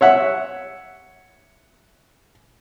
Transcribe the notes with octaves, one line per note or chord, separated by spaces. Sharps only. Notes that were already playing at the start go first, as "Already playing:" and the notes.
C#5 E5 F#5